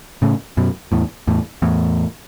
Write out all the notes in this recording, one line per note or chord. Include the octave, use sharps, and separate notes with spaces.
A2 C#3
F#2 B2
E2 A2
E2 A2
E2 A2